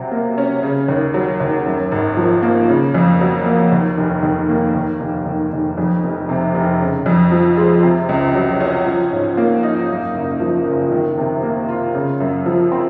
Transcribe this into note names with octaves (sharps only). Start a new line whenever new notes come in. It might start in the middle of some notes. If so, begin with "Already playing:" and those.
Already playing: C3 F#3
A#3
C#4
C#3
D#2
F#3
D#2
F#2
G#1
F3
A#3
C#3
F2
F#3
A#3
D#2
F1
D#3
A#3
D#2
F1
D#3
F1
F2
F1
C3
F1
C#3
F2
F3
G#3
C3
C#2
F#3
C#4
F3
G#2
A#3
D#4
F#2
F#1
F3
F#1
D#3
C3
A#3
F4
C#3
F#2
F3
C4